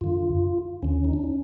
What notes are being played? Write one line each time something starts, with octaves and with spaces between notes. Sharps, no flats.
F#2 D3 F4
D#2 D3 C#4
D#4
D4
C#4